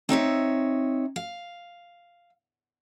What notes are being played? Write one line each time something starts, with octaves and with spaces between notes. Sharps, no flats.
C4 D#4 C#5 E5
F5